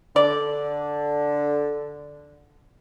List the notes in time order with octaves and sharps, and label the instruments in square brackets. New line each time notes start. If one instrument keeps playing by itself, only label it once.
[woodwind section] D3 [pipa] D5